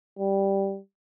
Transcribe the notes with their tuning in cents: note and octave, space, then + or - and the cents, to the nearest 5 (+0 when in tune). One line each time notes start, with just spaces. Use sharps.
G3 +0